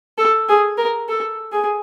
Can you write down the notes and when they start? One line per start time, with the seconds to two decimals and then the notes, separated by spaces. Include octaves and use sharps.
0.18 A4
0.49 G#4
0.78 A#4
1.08 A4
1.52 G#4